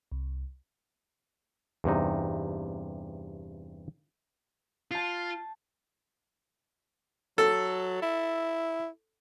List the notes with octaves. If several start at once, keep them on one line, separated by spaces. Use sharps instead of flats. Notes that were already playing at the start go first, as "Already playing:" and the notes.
C2
E2 G2 C3 D#4
F4 A5 G6 C7
F#3 A4
E4